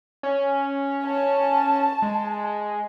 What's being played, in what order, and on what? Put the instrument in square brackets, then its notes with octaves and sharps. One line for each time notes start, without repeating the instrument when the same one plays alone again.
[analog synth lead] C#4
[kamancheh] A5
[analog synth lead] G#3